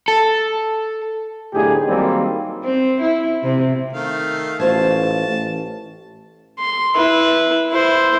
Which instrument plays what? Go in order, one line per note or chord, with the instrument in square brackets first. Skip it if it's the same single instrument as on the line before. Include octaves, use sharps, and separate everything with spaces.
[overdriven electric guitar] A4
[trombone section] B1 A2 D3 D#4 G4 G#4
D#3 F#3 G3 A#3 C4
[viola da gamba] C4
E4
C3
[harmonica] D#3 A3 F5
[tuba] A1 [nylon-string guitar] F4 C5 C#5 [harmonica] A5
[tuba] A1
[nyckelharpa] C6
E4 B4
E4 C5